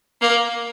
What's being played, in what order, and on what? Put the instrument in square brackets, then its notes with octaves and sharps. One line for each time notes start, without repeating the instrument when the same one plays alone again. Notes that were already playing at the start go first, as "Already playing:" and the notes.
[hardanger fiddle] A#3